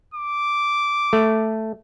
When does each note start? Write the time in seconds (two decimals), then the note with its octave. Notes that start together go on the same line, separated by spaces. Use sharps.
0.14 D6
1.13 A3